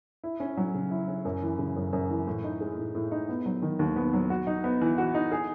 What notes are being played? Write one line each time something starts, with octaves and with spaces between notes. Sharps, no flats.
E4
C#4
F#3
C#3
E4
C#4
F#2
E3
C#3
F#2
F#2
E3
A2
D#4
G#3
A2
A2
D#4
B3
F#3
D#3
D#2
B3
F#3
F#4
D#4
B3
E3
F#4
D#4
G#4